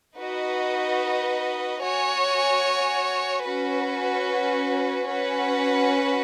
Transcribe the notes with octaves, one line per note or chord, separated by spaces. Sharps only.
D#4 F#4 B4 D#5
F#4 C#5 G#5
C#4 F#4 B4
C#4 F#4 B4 F#5